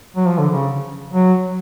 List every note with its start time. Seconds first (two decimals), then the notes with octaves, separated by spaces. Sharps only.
0.17 F#3
0.28 F3
0.39 D3
0.51 C#3
1.14 F#3